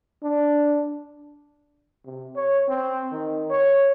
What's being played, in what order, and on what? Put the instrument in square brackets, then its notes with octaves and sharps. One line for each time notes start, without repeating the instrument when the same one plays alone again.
[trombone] D4
C3
C#5
C4
D#3
C#5